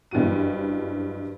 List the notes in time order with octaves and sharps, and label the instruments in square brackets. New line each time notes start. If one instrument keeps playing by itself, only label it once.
[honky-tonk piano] F#1 G2 E3 F#4 D#7